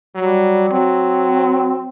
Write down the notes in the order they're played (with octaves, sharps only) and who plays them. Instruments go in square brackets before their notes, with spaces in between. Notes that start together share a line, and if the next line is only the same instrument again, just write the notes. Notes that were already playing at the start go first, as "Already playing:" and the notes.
[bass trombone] F#3 [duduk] G3
[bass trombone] F#3 [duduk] C4